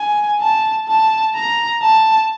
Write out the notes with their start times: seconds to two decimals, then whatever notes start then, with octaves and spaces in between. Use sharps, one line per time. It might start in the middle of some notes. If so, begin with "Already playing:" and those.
Already playing: G#5
0.41 A5
0.88 A5
1.35 A#5
1.82 A5